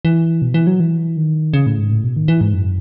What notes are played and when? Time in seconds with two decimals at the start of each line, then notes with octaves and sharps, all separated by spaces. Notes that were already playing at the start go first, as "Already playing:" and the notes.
0.05 E3
0.42 B2
0.54 E3
0.67 F#3
0.80 E3
1.17 D#3
1.54 C#3
1.66 A2
1.78 G#2
1.91 A2
2.04 B2
2.17 D#3
2.28 E3
2.41 G#2
2.54 F#2